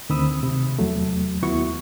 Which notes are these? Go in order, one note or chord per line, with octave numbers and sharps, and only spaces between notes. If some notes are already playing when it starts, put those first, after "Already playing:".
D2 D#3 C4 B5 D#6 E6
C3
E2 F#3 A3
D#2 B3 E4 F#4 C#6